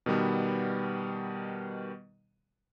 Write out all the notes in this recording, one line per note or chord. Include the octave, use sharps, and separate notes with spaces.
B2 D#3 G3 B3